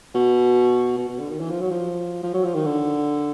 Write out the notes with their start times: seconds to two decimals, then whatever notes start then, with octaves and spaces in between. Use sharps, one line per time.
0.14 B2
0.98 B2
1.08 B2
1.19 D3
1.29 D#3
1.40 E3
1.50 F3
1.60 F#3
1.71 F3
2.23 F3
2.34 F#3
2.44 F3
2.54 D#3
2.65 D3